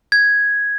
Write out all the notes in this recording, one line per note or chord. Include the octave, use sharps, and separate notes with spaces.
G#6